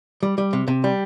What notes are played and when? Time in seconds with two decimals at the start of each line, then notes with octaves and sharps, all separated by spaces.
0.23 G3
0.38 G3
0.53 C3
0.68 C3
0.84 G3